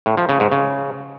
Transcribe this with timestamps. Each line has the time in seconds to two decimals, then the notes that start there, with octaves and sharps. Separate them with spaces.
0.06 A2
0.17 F3
0.29 C#3
0.40 G#2
0.52 C#3